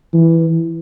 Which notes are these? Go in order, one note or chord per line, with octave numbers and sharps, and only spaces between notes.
E3